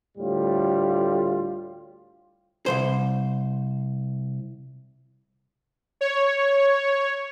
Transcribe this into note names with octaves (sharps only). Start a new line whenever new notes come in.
D2 A2 G3 F4
C2 B2 C5
C#5